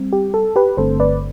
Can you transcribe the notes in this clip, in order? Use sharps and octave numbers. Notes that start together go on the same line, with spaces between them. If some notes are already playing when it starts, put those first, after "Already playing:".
Already playing: G3 C4
G4
A4
G4 B4
G1 G2 D3 A3 C4 A4 C5
B4 D5